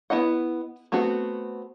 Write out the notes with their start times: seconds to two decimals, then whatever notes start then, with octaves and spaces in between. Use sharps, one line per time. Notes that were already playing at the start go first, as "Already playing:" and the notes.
0.10 B3 E4 D#5 F#5
0.92 A3 B3 C4 F#4